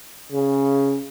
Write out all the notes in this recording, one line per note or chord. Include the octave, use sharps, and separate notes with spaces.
C#3